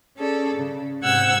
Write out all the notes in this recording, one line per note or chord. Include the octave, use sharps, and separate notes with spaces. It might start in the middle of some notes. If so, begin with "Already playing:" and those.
C#4 G#4 A4 D5
C#3
G#2 C3 F#5 G5 E6 G#6